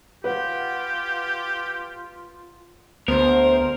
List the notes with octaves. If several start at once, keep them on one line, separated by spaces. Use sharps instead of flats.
F4 G4 B4 F#5
D2 B3 A#4 C5